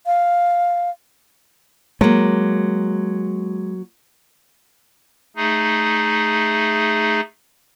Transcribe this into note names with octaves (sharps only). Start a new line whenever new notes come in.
F5
F#3 G#3 A#3
A3 D#4 G#4